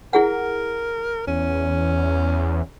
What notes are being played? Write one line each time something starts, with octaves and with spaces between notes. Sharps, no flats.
E4 G#4 A#4 F#5
E2 C#4